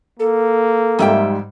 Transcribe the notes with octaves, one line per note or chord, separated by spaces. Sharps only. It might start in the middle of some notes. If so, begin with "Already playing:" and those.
A#3 A4
F2 G#2 G3 E5 G5